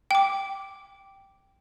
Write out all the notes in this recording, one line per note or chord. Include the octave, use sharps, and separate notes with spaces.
G5 D6